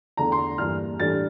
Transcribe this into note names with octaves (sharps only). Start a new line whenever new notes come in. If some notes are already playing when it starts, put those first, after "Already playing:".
E2 D3 A3 A#5
C6
G2 E3 A#3 F6
A2 E3 G3 D4 A6